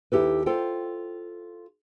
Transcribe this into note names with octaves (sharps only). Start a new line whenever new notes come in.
D#2 E4 G4 A4 B4
F4 A4 C5 G5